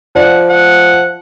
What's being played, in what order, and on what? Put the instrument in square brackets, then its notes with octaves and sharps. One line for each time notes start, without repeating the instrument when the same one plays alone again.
[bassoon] F3 [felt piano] D5 [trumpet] F#5
[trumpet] F#5